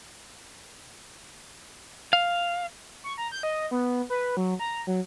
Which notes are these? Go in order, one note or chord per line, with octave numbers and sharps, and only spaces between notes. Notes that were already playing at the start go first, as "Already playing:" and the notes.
F5
C#6
A#5
G6
D#5
B3
B4
F#3
A#5
F#3